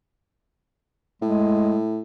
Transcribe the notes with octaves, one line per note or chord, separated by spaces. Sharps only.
A2 G#3